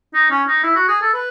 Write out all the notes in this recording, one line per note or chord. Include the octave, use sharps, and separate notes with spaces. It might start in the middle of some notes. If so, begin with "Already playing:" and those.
D#4
C#4
D#4
E4
F#4
G#4
A4
B4